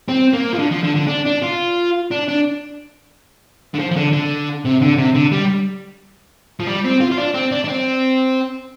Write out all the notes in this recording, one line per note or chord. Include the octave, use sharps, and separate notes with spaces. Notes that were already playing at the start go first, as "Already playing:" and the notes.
C4
A#3
F3
D3
F3
D3
D3
D4
D4
F4
D4
D4
D3
F3
F3
D3
D3
C3
D3
C3
D3
G3
F3
G3
C4
F4
F4
D4
C4
D4
D4
C4